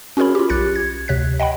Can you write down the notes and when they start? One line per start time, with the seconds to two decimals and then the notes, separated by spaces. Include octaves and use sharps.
0.17 C#4 F#4 G#4 A#4 C#5 B5
0.35 F4 G4
0.49 B1 F#6 A6 C#7
0.76 G#6
1.08 D2 C3 C#5 F#6 B6
1.40 D#5 F#5 G5 B5